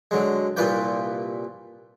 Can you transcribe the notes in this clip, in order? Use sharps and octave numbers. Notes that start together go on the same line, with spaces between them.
D3 F#3 G#3
C2 A#2 F4 B4 D5 G5